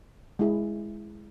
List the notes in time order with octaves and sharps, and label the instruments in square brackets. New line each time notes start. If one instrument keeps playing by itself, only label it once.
[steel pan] G#3 E4 G#4